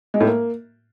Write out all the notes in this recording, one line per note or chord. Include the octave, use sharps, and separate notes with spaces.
G#3
A2
A#3